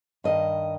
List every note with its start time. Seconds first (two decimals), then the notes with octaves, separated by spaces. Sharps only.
0.24 G2 D#3 D#5